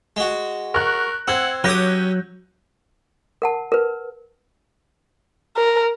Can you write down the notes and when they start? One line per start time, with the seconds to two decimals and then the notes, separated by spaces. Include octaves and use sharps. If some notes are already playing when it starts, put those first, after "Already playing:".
0.16 G#3 F#4
0.74 A#4 C#6 F#6
1.28 C4 F#5 E6 G#6
1.64 F#3 C#4 G4 D6 D#6 F#6 G6 A#6
3.42 A#4 F#5 A5
3.72 A#4 B4
5.56 A#4